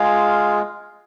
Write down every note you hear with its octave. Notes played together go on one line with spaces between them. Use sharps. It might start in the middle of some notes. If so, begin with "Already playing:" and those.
Already playing: G#3 F4 G#4 F5